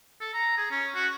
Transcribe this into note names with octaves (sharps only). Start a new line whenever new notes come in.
A4
A#5
G#4
C#4
F#4